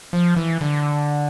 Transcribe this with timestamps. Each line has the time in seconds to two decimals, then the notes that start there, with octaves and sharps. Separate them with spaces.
0.13 F3
0.36 E3
0.61 D3